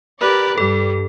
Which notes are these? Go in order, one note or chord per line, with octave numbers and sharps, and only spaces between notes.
G4 A#4 B4 D5
G2 G3 A4